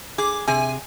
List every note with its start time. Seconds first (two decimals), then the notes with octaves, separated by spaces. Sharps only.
0.18 G#4 D6
0.47 C3 G#4 G#5